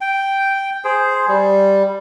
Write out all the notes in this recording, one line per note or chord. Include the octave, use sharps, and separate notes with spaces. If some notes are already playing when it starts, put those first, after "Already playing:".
G5
G#4 C5
G3